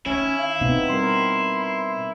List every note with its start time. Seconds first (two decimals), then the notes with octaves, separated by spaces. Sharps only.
0.06 D#3 C#4 E4 C#5
0.38 F5
0.61 B2 B3 C4 D#4
0.89 G3 C4 A#4 C6